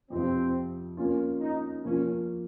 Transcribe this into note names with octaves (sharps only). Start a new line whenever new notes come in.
F2 C3 F3 C4
A#3 C#4 F4
D#4
F3 A#3 C#4 F4